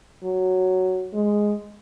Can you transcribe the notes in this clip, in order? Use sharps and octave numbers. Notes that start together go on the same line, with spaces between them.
F#3
G#3